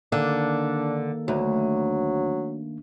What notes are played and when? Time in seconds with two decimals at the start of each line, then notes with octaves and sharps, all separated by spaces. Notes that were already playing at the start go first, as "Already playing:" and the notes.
0.12 D3 D#3 A#3 D4
1.28 D2 F#3